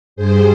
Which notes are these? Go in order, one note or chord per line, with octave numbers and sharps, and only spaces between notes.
G2 G3 G#4 C5